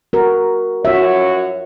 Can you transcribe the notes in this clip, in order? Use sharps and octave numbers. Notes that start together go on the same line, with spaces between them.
F#4 A#4
F#2 F4 F#4 C#5 E5